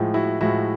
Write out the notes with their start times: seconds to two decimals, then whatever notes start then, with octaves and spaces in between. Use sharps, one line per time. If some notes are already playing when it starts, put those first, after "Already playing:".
Already playing: A2 F3 G#3
0.14 E4 F#4
0.41 A2 F3 G#3 E4 F#4